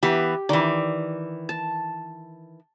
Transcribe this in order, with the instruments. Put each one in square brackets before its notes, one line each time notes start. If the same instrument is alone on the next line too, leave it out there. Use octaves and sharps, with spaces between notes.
[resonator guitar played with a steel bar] E3 B3 [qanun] G4
[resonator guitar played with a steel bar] D#3 E3 [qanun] D5
[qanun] A5